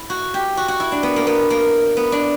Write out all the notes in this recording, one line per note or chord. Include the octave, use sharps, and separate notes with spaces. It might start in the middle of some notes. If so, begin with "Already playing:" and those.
Already playing: E4
F#4
G4
F#4
F#4
E4
D4
B3
A#3
B3
A#3
B3
D4